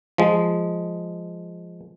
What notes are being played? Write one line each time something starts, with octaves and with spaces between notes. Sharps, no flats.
F3 G#3